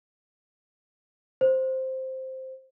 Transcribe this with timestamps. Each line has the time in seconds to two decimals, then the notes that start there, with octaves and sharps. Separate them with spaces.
1.41 C5